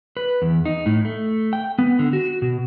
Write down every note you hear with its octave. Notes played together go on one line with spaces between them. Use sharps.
B4
E2
D#4
A2
A3
G5
B3
D3
F#4
B2